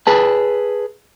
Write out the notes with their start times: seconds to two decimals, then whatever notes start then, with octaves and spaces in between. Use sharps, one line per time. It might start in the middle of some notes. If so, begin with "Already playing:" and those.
0.07 G#4 B4 A5